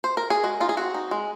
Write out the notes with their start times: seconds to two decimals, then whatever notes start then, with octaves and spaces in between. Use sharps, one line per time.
0.04 C5
0.17 A#4
0.30 G#4
0.43 G#3 F#4
0.60 D#4 F4
0.69 G#4
0.77 C4 F#4
0.94 D#4
1.11 G#3